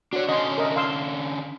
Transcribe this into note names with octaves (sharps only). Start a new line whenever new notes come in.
D4 F#4 C#5 F#5
D3 C#4 D#5 C6
A#4 D#5 E5
F5 C6 E6